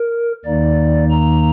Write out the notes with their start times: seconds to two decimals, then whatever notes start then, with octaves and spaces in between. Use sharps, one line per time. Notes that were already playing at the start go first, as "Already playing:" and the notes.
Already playing: A#4
0.45 D#2 D#3 A#3 D#4 D5
1.10 A#5